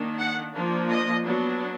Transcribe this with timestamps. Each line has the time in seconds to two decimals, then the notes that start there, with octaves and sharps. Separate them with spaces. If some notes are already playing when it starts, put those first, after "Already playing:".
Already playing: D#3 A#3 D4
0.19 F#5
0.54 F3 A#3 D4
0.89 D#5
1.25 F#3 B3 D4